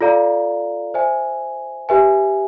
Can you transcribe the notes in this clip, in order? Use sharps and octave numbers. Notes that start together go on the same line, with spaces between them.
F4 A4 D5 F5 A#5
C5 E5 G#5
G4 B4 E5 G#5